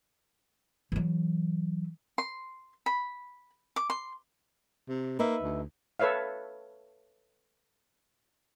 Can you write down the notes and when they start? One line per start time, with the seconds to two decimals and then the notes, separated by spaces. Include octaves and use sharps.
0.92 E3 F#3
2.18 C6
2.86 B5
3.76 D6
3.90 C6
4.88 C3
5.19 A#3 D#4 B4 E5
5.42 D2
5.99 A4 B4 C#5 E5 F5